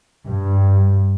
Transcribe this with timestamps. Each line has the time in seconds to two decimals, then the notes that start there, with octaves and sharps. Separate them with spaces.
0.25 G2